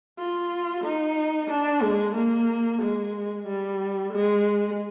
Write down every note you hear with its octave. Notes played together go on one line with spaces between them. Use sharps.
F4
D#4
D4
G#3
A#3
G#3
G3
G#3